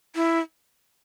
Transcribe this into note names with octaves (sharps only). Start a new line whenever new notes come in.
E4